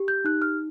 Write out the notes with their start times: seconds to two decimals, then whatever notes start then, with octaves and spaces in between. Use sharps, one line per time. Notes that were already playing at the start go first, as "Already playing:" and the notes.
Already playing: G4
0.08 G6
0.25 D#4 F#6
0.42 F6